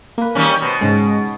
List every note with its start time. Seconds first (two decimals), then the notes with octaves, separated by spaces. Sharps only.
0.18 A#3 B4
0.35 D#3 G3 C#4
0.62 B2 B4 C5 D#5
0.81 G#2 C#3 G#3